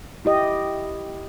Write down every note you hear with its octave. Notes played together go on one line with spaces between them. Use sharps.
E4 G4 D#5